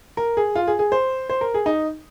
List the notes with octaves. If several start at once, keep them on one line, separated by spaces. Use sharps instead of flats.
A#4
G#4
F4
G#4
G#4
C5
C5
A#4
G#4
D#4